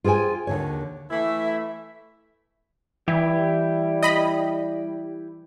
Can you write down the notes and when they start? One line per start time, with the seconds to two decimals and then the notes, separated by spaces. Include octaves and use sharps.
0.04 F4 G#4 C5 G5 G#5
0.47 D#2 D3 C#5
1.10 E3 A3 E4 E5
3.08 E3 G3 E4 G4
4.03 D#5 B5